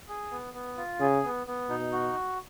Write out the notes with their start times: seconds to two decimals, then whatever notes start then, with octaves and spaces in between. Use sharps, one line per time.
0.08 G#4
0.31 B3
0.54 B3
0.77 F4
1.00 C#3 G#4
1.24 B3
1.47 B3
1.69 B2 D#4
1.92 F#4